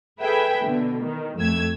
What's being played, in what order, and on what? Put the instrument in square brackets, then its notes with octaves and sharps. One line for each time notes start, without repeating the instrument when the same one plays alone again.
[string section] G#4 A4 B4 E5 G5
B2 D3
D#3
F2 A3 E6 G#6